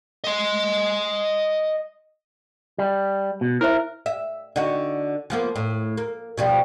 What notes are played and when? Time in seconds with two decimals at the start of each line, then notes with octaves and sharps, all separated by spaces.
0.24 D#5 C6
2.78 G3
3.41 B2
3.61 E4 A#4 C5 E5
4.06 E5
4.56 D3 D#4 F#4
5.30 F3 A#3 B3
5.56 A2
5.98 A#3
6.38 B2 F3 G3